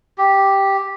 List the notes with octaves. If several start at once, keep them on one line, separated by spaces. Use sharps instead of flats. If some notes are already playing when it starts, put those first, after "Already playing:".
G4